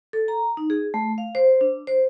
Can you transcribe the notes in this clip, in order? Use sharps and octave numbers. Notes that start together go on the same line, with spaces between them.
A4
A#5
D#4
G#4
A3
F5
C5
D4
C5